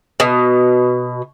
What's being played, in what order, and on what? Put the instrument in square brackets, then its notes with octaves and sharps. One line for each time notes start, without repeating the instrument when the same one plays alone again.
[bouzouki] B2